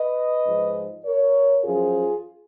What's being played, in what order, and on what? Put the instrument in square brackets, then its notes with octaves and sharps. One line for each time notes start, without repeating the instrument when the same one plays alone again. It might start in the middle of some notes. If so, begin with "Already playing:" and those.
Already playing: [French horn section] B4 D#5
G#2 F3
A#4 C#5
F#2 F3 F4 G#4